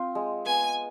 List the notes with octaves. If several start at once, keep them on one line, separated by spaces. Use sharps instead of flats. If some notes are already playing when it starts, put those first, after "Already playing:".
Already playing: C4 F4
G#3
B3 G#5